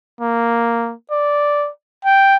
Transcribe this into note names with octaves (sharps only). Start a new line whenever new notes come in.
A#3
D5
G5